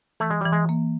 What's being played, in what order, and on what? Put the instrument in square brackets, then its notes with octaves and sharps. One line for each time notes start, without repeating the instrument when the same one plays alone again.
[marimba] E3 [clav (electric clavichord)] A3
[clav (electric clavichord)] G#3
[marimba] E3 [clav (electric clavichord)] G3
[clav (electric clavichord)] G#3
[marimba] A#3